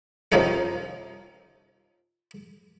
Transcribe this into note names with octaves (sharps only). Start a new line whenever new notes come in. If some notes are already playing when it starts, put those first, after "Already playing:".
C3 F3 A#3 C#4 D#4 A4